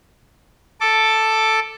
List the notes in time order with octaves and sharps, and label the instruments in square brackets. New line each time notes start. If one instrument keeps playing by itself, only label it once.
[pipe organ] A4 D6